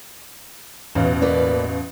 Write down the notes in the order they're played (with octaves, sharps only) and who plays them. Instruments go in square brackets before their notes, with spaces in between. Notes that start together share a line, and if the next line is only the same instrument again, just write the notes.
[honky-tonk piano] A1 B2 [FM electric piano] E2 C#4 F5
[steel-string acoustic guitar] A#3 B4 D5